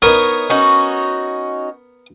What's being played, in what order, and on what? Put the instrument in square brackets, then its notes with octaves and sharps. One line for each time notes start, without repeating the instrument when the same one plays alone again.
[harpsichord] B3 A#4 [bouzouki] D#4 C#5
[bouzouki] C#4 D#4 F#4